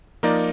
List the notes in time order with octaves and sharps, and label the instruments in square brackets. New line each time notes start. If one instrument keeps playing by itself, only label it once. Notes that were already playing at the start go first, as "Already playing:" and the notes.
[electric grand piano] F3 A#3 D#4 A#4 D5